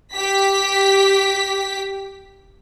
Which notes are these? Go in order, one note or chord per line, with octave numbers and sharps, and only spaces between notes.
G4 B6